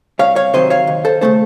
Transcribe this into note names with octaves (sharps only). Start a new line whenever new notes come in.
C2 C#5 F5
C#5 F5
C3 D#3 F#3 C5 D#5
C#5 F5
D#2
A4 C5
C#3 A3 A4 C5